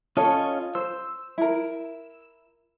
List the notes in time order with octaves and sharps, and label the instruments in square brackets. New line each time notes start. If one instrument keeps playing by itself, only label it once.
[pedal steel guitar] C#4 F4 D#5 [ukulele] A4 C#5
[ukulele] C5 [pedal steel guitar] E6
[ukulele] E4 A#4